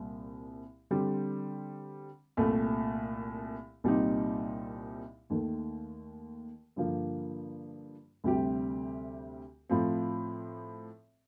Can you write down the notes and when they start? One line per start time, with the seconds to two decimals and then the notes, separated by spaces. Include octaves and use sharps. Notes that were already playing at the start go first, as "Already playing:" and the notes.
Already playing: C2 A#2 G3 C4
0.91 D3 G3 C4
2.37 C2 A#2 A3
3.84 C2 A#2 G3 C4 D#4
5.30 D#2 D#3 A3
6.76 G2 D3 F3 A#3
8.24 D2 C3 G3 C4 G4
9.70 A2 F3 C4